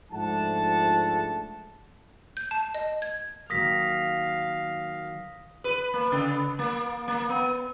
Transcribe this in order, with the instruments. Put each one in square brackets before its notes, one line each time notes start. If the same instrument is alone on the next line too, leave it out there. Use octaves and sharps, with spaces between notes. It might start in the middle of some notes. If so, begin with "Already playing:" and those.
[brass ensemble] G#2 F3 A3 D4 F#5 A5
[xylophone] G6
A5
D#5
G#6
[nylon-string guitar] D#3 F#3 A#3 [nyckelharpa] F5 [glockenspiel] D#6 A#6 B6
[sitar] B4
A#3
C#3
A#3
A#3
B3